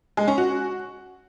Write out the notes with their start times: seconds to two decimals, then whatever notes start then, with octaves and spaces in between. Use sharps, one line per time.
0.17 G#3
0.28 C#4
0.38 F#4